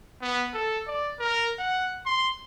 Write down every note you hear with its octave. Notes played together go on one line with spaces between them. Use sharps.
B3
A4
D5
A#4
F#5
C6